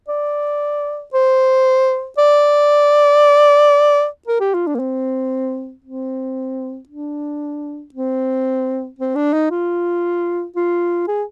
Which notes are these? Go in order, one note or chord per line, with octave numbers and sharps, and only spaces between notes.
D5
C5
D5
A#4
G4
F4
D4
A#3
C4
C4
D4
C4
C4
D4
D#4
F4
F4
G#4